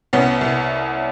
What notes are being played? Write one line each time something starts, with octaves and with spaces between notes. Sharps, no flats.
C2 B3 C#4
C2